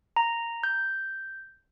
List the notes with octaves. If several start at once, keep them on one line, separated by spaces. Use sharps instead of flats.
A#5
G6